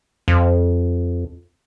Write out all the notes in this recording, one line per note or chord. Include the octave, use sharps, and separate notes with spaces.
F2